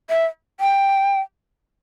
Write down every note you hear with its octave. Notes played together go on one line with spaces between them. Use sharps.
E5
G5